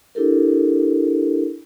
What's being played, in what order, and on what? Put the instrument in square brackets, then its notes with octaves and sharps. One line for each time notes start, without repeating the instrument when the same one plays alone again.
[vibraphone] D4 E4 G4 A4 A#4